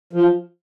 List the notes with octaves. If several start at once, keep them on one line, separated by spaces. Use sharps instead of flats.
F3